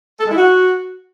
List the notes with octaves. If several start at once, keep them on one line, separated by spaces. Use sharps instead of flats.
A4
G#3
E4
F#4